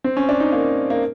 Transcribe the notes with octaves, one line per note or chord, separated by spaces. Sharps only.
C4
C#4
D4
D#4
A#3
A#3